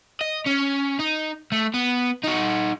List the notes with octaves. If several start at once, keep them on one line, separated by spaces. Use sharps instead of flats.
D#5
C#4
D#4
A3
B3
D#4 F#4